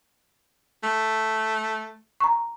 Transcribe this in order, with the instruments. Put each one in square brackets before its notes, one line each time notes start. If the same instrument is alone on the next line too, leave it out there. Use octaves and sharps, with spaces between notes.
[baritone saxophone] A3
[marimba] A#5 C#6